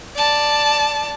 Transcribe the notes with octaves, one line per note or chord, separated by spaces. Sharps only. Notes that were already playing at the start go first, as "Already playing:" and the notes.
D5 A5